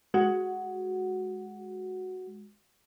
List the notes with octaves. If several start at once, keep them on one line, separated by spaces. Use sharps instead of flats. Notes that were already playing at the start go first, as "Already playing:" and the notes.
G#3 F#4